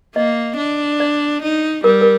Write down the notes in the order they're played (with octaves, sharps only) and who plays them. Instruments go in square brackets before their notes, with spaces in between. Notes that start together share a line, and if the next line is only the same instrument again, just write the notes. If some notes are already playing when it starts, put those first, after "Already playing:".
[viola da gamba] A#3 [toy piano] D#5
[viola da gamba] D4
[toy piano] D5
[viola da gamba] D#4
[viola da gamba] G3 [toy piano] A#4
[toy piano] A#4